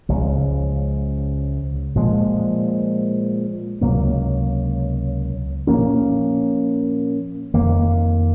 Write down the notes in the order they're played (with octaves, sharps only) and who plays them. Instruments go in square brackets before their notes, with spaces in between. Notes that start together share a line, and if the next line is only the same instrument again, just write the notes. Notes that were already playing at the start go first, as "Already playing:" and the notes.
[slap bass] C#2 C#3 F3 G#3
A#2 F3 G#3
C#2 C3 F#3 A#3
A#2 F3 A#3 C#4
F2 D#3 A#3